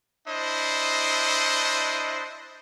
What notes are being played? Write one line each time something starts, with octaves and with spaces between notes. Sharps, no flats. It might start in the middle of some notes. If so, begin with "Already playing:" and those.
D4 E4 C5 D#5